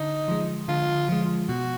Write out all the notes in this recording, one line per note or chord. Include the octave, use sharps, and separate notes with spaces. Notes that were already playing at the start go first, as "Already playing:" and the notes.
Already playing: D3 D#4
F3 G#3
D3 F4
F3 G#3
B2 F#4